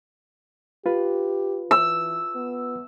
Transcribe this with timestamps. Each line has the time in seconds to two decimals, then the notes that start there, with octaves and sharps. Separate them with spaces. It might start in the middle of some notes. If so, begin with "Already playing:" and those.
0.86 F4 G4 B4
1.71 E3 E6
2.35 B3